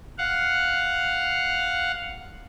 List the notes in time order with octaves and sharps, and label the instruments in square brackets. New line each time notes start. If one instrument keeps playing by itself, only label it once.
[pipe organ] F5 F#5